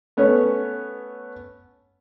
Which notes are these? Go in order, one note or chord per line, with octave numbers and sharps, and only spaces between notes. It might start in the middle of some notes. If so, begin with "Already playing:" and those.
A3 B3 C#4 C#5